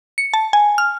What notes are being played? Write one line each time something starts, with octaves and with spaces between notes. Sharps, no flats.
C#7
A5
G#5
F6